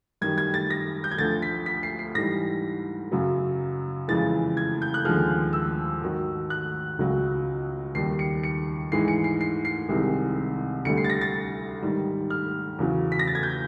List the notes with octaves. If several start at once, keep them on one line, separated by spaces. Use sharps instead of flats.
F#2 D#3 G3 G#6
G#6
A6
A#6
G6
G#6
D2 D3 F3 A6
B6
B6
C7
C7
G#2 E3 G3 A#6
F#2 C#3 F#3
F2 C#3 E3 G#3 A6
G#6
G6
F#6
D#2 D3 F3 G#3 F6
E6
G#2 D#3 F#3
F#6
C#2 C#3 F#3
D#2 D#3 G3 C7
C#7
C#7
G#2 E3 G#3 C7
C#7
C7
C7
C7
C2 C3 D#3 G#3
D2 D3 G3 C#7
C7
A6
A#6
A6
G#2 D#3 G3
F6
E2 C#3 F#3
B6
A#6
A6
G#6
G6